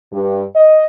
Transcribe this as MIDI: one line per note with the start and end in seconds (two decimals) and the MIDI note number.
0.12 0.43 43
0.55 0.86 75